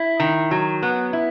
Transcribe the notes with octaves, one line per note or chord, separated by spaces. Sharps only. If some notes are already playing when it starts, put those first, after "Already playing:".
Already playing: E4
D#3
F#3
B3
E4